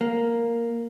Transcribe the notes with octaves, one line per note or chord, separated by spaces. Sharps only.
A#3